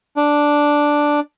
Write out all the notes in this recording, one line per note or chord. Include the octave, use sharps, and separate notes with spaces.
D4